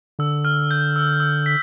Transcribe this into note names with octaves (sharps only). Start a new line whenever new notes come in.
D3 E6
F6
G6
E6
E6
B6